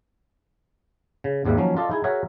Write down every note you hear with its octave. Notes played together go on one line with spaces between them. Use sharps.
C#3
G#1 D#2 G#2 G3 A#3 E5
D#3 F3 F#3 A#3 C#4
F4 A4 D5 D#5 F5
D#4 E4 G#4
F#4 G#4 A#4 C#5 E5